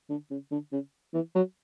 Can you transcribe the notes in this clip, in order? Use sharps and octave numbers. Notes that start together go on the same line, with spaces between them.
D3
C#3
D3
C#3
E3
F#3